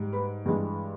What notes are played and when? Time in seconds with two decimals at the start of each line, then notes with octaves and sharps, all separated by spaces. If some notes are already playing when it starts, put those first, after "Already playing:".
Already playing: G#2 G3
0.13 B4
0.46 G2 E3 G#3 G4